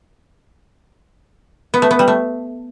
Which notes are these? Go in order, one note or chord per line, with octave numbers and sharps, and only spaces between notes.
B3
A3
B3
G3
A3